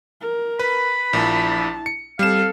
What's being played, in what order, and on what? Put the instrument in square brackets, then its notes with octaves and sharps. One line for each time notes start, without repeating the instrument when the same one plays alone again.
[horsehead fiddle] A#4
[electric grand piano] B4 [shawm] B5
[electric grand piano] A#1 A#2 [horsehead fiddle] E4 A5
[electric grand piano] C#7
[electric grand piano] G3 E7 [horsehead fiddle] C4 A4 [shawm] F5